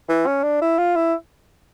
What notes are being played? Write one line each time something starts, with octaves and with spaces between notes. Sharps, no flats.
E3
C#4
D4
E4
F4
E4